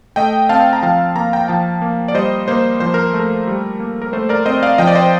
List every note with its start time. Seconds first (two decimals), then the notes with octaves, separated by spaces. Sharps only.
0.16 A3 D#5 G5
0.49 C4 F5 A5
0.73 A#5
0.83 F3 F5 A5
1.16 A#3 A#5
1.33 G5 A#5
1.48 F3 F5 A5
1.82 A#3
2.08 D5
2.15 G3 C5 D#5
2.48 A#3 C5
2.80 F3 C5
2.94 A#4
3.13 A3
3.19 A#4
3.47 G3
3.80 A#3
4.02 A#4
4.13 A3 C5
4.29 A#4 D5
4.45 C4 C5 D#5
4.63 D5 F5
4.78 F3 D#5 G5
4.87 D5
4.95 C5 D#5